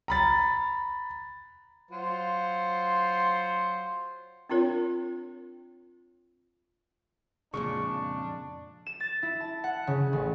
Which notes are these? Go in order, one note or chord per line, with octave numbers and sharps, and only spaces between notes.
A#5 B5 A6
F#3 F4 C5
C4 D4 F4 A#4 C#5
F2 A#2 C#3 G#3 D4 C#6
E7
A6
E4
A5
F#5
C#3
A1